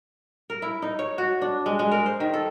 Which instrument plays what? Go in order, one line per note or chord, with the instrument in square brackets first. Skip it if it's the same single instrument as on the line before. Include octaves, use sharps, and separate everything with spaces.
[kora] A#4
E4
D#4
C#5
F#4
D4
G#3
G#3
A#4
C5
D#3
A4